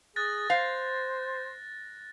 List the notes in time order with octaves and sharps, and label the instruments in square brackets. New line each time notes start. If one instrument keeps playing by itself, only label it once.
[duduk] G#4 [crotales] F#6 A6 A#6
[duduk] C5 [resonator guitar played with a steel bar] F5